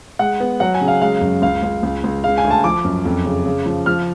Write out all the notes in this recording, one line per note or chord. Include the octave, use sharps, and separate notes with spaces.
G#3 F#5
B3
F#3 F#5
G#5
C#3
F5
G#3 F5
F#2
C#2 F5
C#2
C#2
C#2
C#3 F5
G#5
D2
A5
F3 D6
F#2
F2
C#3
C#3
F3
F3 F6